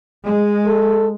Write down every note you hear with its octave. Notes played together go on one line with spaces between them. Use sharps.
G#3
A4